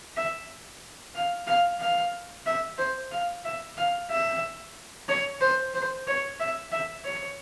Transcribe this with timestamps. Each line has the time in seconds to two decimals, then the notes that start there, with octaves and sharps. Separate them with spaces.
0.17 E5
1.15 F5
1.47 F5
1.80 F5
2.46 E5
2.78 C5
3.12 F5
3.45 E5
3.77 F5
4.10 E5
5.09 C#5
5.41 C5
5.74 C5
6.07 C#5
6.40 E5
6.72 E5
7.05 C#5